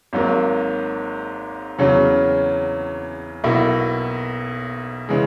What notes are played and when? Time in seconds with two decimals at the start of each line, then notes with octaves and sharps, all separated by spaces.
0.13 G#1 G#2 F#3 A#3
1.79 E2 C#3 F#3 C#4
3.44 B1 B2 A#3 E4
5.09 C#3 E3 G#3